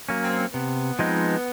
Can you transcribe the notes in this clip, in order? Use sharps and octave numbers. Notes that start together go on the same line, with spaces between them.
F#3 A#3 C#4
C4
C3 B3
F3 G#3 C4 D#4